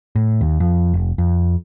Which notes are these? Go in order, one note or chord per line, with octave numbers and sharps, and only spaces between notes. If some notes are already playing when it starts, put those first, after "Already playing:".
A2
D#2
F2
F1
F2